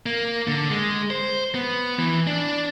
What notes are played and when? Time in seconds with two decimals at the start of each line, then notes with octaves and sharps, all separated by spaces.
0.06 A#3
0.48 D3
0.70 G#3
1.10 C5
1.55 B3
1.99 E3
2.27 D4